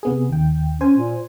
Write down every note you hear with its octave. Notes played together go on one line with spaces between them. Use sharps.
C3 B3 G#4
D#2 G5
C#4 C5 G#5
A#2